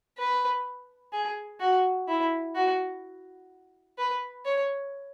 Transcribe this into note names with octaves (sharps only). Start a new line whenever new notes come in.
B4
G#4
F#4
E4
F#4
B4
C#5